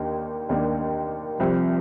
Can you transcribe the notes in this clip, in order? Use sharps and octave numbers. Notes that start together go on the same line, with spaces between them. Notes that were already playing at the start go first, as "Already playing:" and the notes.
Already playing: D#2 D#3 A#3 D4
D#2 D#3 A#3 D4
C2 C3 F3 G3 C4